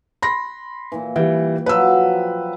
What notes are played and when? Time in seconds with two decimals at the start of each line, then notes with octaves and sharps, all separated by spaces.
0.22 B5 C6 A#6
0.92 A#2 E3
1.16 E3 G3 G5
1.66 F3 F#3 B4 E6